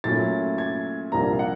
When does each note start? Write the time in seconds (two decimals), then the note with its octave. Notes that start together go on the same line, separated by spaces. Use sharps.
0.04 A#2 F#3 A3 C#4 E4 A6
0.58 G#6
1.12 C2 C3 F3 A#3 D4 A#5
1.33 F5
1.39 F#5